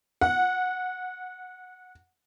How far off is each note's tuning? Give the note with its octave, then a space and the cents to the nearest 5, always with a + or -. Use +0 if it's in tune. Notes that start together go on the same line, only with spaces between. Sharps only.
F#5 -5